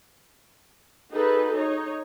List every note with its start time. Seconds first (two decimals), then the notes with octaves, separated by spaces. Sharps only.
1.10 D#4 F#4 G#4 A4 B4
1.54 D#4 C#5